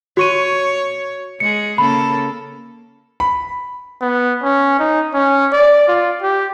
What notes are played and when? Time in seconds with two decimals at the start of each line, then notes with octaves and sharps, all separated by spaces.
0.17 F#4 C#5 C#6 D#7
1.40 G#3 G#4 C#7
1.78 C#3 A#3 A4 B5
3.20 B5
4.01 B3
4.43 C#4
4.79 D#4
5.13 C#4
5.52 D5
5.88 F4
6.22 G4